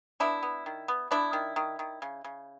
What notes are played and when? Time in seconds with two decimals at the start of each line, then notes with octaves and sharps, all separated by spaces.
0.20 B3 D4 E4
0.43 B3
0.66 D#3
0.88 B3
1.11 B3 D4 E4
1.33 D#3
1.56 D#3
1.79 D#3
2.02 C#3
2.24 C#3